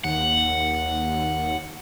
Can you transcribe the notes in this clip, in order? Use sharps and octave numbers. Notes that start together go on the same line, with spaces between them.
D#2 F#5